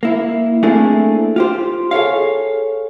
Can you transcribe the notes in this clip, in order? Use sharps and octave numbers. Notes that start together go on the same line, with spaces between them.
A#3 E4
A3 A#3 C4 D4 E4 G#4
F4 G4 C5
G#4 A4 C#5 F5